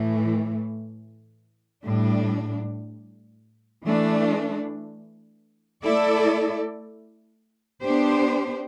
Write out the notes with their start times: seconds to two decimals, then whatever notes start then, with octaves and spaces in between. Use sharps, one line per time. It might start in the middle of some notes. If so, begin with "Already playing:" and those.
Already playing: A2 E3 A3
1.83 A2 G3 D4
3.83 E3 A3 D4
5.83 A3 E4 A4 D5
7.82 B3 D4 G4 C5